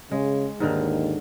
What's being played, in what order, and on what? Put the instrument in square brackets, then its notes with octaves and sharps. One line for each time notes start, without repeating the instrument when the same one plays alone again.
[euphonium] C#3 [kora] G#3
[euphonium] D#2 [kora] G#2 D3 D#3